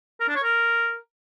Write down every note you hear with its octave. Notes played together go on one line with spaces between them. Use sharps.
A#4
D4
C#5
A#4